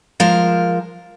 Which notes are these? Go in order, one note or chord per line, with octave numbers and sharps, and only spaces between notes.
F3 G#3 A#4